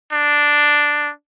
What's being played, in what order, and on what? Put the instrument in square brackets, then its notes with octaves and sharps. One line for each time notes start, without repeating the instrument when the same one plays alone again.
[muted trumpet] D4